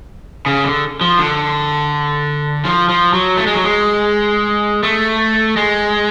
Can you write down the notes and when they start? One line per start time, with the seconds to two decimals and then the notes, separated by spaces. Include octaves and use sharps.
0.46 C#3
0.64 D3
1.01 F3
1.19 D3
2.65 F3
2.89 F3
3.13 F#3
3.37 A3
3.46 G#3
3.55 F#3
3.64 G#3
4.83 A3
5.57 G#3